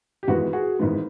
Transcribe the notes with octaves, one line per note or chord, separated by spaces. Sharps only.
G4
G#1 G#2 E3 G#3 B3 F#4
F#4 G#4
G#1 G#2 E3 G#3 B3